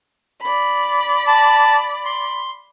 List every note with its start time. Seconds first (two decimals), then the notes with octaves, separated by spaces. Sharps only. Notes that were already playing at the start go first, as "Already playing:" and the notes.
0.42 D5 B5
1.27 A5
2.05 C6